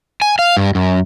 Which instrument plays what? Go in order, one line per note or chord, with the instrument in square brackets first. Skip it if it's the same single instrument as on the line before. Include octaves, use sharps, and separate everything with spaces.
[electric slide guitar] G#5
F5
G2
F#2